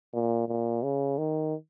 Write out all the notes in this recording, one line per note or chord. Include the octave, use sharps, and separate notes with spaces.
A#2
A#2
C#3
D#3